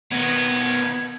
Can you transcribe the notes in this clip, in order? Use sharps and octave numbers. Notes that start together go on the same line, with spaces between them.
B2 D#3 B3 G#6